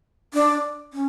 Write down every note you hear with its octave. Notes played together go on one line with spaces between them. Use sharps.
D4
C#4